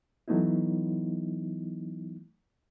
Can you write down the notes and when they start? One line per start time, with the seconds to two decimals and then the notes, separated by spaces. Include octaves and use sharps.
0.28 E3 F#3 A3 B3 D#4 E4